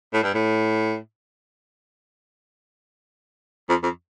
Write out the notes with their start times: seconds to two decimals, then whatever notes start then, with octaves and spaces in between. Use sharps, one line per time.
0.14 A2
0.24 G2
0.34 A2
3.69 F2
3.83 F2